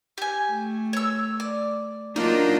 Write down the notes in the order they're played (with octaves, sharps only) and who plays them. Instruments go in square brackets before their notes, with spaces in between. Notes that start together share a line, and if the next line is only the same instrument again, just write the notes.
[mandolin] G4 G#5
[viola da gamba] A3
[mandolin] C#5 E6
D5
[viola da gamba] F#3 D4 F4 [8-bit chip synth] A#3 D#4 [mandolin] D5